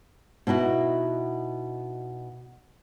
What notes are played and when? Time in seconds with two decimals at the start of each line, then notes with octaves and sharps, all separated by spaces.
0.47 B2 D#4 E4 F#4